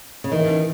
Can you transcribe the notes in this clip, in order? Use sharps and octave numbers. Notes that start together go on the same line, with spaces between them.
C#3
D#3 E3